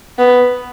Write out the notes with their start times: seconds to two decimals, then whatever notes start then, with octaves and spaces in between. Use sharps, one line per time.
0.18 B3